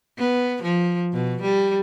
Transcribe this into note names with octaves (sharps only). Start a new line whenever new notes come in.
B3
F3
B2
G3